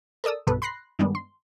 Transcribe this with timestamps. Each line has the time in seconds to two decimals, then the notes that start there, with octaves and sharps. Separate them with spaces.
0.24 A4 A#4 D5 D#6 E6
0.47 B1 G2 B2 A4 B4
0.62 B5 C6 F#6 A#6 C7
0.99 G2 D#3 G3 G#3 B3 D4
1.15 C6